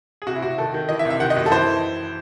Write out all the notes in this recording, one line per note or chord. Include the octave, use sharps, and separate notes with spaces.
G#4
C3 F#4
E4
C3 F#4
D#3 A4
D#3
E3 D#5
E5
C3
E5
D#3 F#5
D#5
F#2
A4
E3 C5